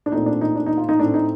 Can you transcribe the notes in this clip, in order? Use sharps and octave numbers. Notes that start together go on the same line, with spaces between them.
D4
A#2 A3 C4 D#4
D4
D#4
D4
D#4
F4
D#4
A2 A3 C4 D4
D#4